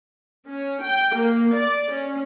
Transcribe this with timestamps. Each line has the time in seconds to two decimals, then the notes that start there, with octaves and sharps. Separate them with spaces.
0.47 C#4
0.83 G5
1.16 A#3
1.52 D5
1.93 C#4